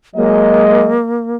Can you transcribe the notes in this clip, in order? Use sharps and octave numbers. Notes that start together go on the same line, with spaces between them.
F#3 G#3 A#3 D#5